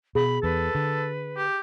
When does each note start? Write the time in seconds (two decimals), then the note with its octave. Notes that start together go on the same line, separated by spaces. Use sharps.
0.15 B2 G#4 B5
0.43 E2 A4 B4
0.75 D3
1.37 G4